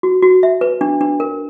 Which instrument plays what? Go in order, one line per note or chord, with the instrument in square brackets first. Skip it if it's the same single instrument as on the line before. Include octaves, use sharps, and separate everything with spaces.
[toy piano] F#4
F#4
E5
B4
D4
D4
A#4